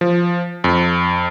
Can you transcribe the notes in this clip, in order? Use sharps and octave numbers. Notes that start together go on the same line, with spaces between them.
F3
F2